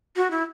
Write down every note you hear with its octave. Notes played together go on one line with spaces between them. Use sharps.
F#4
E4